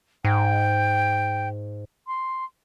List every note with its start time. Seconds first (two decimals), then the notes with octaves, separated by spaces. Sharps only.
0.25 G#2 G5
2.07 C6